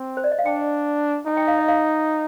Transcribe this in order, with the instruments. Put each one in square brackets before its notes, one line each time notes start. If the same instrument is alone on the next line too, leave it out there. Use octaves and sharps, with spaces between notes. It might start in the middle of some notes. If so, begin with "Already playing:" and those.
Already playing: [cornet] C4
[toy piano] C5
D5
D#5
F5
[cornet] D4 [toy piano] G5
[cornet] D#4 [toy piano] G#5
[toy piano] G5
F5
D#5
F5